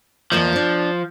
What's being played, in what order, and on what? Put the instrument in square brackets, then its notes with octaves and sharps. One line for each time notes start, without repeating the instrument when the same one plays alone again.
[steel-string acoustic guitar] E2 A#3 D#5 [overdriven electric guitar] F3
[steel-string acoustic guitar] D4 C5